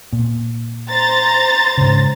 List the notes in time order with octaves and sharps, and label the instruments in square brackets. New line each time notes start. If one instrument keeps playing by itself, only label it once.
[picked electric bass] A#2
[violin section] C5 A#5 A6
[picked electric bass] G#2 C#3